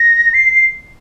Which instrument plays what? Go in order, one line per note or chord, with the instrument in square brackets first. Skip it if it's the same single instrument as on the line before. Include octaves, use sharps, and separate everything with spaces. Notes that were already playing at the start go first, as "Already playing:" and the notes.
Already playing: [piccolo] A#6
C7